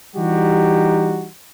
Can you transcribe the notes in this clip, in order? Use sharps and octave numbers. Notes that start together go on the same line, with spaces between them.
E3 G3 D#4 F#4 G4